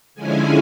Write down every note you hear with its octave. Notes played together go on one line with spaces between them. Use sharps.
D3 F3 G#3 C#4 E4 G#5